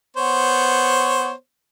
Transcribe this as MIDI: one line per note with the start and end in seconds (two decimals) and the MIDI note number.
0.17 1.32 59
0.17 1.32 72
0.17 1.32 73